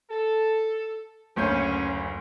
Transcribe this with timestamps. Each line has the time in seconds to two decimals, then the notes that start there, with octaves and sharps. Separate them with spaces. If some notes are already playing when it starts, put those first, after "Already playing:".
0.10 A4
1.36 F#1 D2 C#4 G6